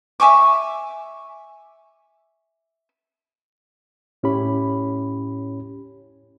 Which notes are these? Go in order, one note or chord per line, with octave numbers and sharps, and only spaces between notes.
E5 G#5 C#6 D6
A2 C#4 E4 G4 C#5 B5